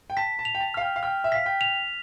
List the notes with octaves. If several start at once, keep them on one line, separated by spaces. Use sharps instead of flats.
G5
A5 B6
A5
F7
G5
A5
F5 F6
G5
F5
G5 F6
E5
F5 B6
G5
F7